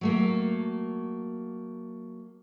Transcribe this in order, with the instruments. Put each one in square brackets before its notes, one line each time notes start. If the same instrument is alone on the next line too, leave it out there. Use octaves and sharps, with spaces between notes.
[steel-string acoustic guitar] F#3 A3 A#3